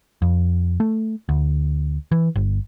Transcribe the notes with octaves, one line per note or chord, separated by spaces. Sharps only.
F2
A3
D2
E3
G1